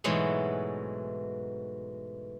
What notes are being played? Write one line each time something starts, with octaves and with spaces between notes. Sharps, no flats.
G#2 B2 E3 F#3 G#3 A3